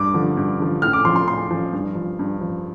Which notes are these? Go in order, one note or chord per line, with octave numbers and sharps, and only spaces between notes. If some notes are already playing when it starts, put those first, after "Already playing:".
Already playing: G2 D6
D3 F3
G2
D3 F3
A2 F6
D6
F3 C6
C6
A2 C6
F3
G2
F3
G2
F3